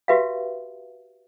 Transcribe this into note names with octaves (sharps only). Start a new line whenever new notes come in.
F#4 G4 B4 E5 F5